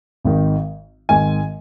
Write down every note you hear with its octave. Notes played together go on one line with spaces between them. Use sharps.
G#1 G#2 D#3
G#1 G#2 D#3 G#5